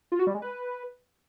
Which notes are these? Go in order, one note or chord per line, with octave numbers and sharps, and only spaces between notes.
F4
F#4
G3
G#3
B4